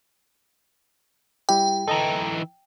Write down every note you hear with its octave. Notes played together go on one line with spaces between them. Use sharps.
G3 E4 G4 G5
E3 D#4 A4 D#5 A#5